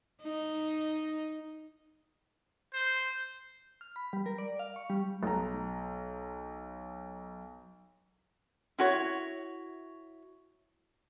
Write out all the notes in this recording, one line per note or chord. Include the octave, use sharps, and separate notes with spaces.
D#4
C5
F6
B5
G3
A#4
D5
F5
C#6
G3
B1 A#5
E4 F#4 C#5